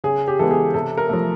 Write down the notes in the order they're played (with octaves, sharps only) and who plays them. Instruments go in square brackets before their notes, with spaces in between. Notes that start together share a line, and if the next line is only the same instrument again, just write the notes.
[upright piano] C#3 G#4
G4
E3 G#3 B3 A4
G#4
C3 A4
A#4
F3 A3